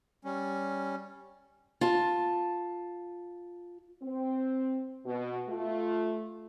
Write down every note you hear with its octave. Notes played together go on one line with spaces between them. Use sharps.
G3 C#4
F4 A5
C4
B2
A3 F4